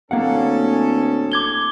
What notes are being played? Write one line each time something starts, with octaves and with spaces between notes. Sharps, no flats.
D1 A#3 C#4 G#4 A4 F5 F#5
D6 G#6 G7